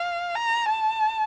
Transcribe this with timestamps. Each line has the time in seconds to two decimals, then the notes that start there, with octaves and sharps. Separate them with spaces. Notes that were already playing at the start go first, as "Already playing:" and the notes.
Already playing: F5
0.35 A#5
0.68 A5